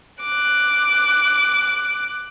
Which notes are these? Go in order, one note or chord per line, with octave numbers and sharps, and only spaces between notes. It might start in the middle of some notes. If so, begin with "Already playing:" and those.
D6 F#6